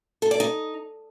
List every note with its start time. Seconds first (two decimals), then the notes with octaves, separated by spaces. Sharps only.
0.22 A4
0.31 D5
0.40 D#4